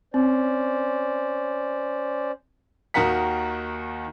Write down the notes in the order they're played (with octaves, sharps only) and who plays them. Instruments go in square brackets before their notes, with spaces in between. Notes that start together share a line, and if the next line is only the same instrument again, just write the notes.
[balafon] C4 [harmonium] C#4 C5 D5
[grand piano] D#2 D#3 F#4 A#4 F#5 B6